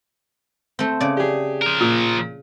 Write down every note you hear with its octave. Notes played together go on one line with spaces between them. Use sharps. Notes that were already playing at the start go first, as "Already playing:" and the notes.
A3 C4
C#3 D5
G4 G#4
F3 A#4
A#2